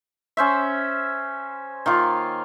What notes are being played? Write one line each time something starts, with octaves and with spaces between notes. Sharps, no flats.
C#4 C5 E5
D#3 A#3 F4